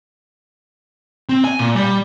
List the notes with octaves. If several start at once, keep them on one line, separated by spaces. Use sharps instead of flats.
C4
G#5
A#2
G3